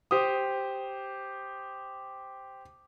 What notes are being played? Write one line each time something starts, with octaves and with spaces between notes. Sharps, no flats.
G4 C5 D#6